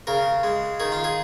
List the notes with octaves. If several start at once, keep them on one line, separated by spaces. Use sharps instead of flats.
C#3 A#4
G#3
D#3 G#4
F4
G#4